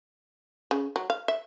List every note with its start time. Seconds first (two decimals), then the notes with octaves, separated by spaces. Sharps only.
0.71 C#3
0.96 F#3
1.10 F5
1.28 E5